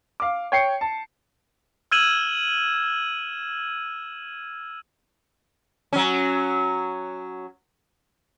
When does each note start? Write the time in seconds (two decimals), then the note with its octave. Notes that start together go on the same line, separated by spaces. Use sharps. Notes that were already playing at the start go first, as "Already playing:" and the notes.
0.20 F5 D6
0.52 C#5 G5 C7 C#7
0.81 A5
1.91 E6 F6 G#6 D#7 E7 F#7
5.93 F#3 C#4